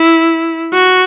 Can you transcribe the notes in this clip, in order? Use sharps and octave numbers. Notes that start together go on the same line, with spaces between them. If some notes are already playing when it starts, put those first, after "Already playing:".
Already playing: E4
F#4